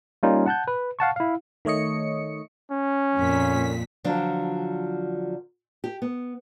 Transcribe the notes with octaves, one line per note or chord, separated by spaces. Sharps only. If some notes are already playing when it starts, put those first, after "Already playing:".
G3 A#3 C#4 D#4 F4
F#5 A5 F#6 G6
B4
F5 F#5 A5 C#6
E4 F5
D#3 A3 C#5 D#5 C#7
C#4
F2 A#2 B6
D3 F3 F#3 D4
G4
B3